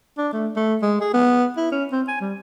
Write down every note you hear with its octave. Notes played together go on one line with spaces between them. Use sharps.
D4
A3
A3
G#3
G#4
B3
E4
C#4
C4
G#5
G3